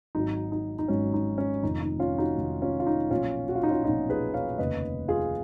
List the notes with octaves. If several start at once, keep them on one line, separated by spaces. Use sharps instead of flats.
G#1 G#2 F#3 D#4
D#4
D#4
G#1 G#2 F#3 C#4
D#4
C#4
F1 F2 D#3 D#4
D#4
C#4 F4
D#4 F#4
F1 F2 D#3
C#4 F4
F4
D#4
B1 A#2 F3 C#4 F4
F#4
F4
D#4
C#4 F4
B1 A#2 F3 D#4
G#4 B4
C#5 F5
F1 D#2 C#3 B4 D#5
F4 G#4